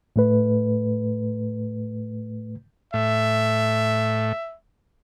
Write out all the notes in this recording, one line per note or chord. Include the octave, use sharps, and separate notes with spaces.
A2 A3 B4
A2 E5